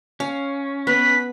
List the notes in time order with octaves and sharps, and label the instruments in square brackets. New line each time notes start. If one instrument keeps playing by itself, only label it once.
[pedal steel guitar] C#4 [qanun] F5
[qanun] B3 [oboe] B4 [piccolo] B6